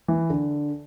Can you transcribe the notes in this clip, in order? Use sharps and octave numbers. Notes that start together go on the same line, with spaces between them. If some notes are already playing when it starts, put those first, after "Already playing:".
E3
D3